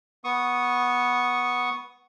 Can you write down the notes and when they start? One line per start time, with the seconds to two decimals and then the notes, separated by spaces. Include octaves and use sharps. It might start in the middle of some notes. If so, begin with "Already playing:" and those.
0.24 B3 C#6 D#6